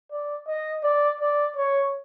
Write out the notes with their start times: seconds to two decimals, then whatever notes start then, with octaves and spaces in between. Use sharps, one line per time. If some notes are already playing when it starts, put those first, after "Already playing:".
0.11 D5
0.47 D#5
0.83 D5
1.20 D5
1.57 C#5